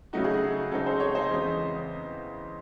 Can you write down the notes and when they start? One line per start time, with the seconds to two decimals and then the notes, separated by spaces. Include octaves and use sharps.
0.13 C#3 F#3 A3 D#4 F#4
0.24 G#4
0.34 D#4 F#4
0.72 C#3 G#3 C4 D#4 F#4 A4
0.86 G#4 C5
1.00 A4 C#5
1.15 C5 D#5
1.30 E2 C#3 G#3 C4